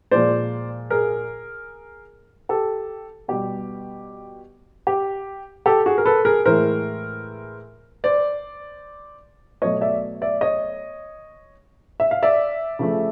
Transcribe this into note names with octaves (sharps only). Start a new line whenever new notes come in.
A#2 F3 G#3 C5 D5
G#4 A#4
G4 A4
B2 G3 G4
G4
G4 A4
F#4 G#4
A#4
A4 B4
G#4 A#4
A2 E3 G#3 A#4 C5
C5 D5
B2 F#3 A3 C#5 D#5
D5 E5
D5 E5
C#5 D#5
E5
F5
D5 E5
C#3 F3 A3